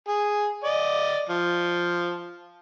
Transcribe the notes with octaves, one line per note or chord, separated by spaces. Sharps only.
G#4
D5 D#5
F3